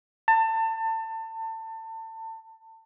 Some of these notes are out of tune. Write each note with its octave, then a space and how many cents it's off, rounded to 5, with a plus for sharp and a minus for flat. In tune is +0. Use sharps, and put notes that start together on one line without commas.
A5 +30